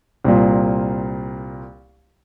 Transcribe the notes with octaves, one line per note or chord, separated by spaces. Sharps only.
C2 A#2